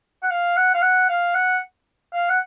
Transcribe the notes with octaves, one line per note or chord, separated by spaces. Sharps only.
F#5
F5
F#5
F5
F#5
F5
F#5
F5
F#5